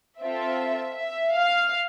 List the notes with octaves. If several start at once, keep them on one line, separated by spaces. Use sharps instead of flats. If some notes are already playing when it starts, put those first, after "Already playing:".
C4 F4 A4 E5
E5
F5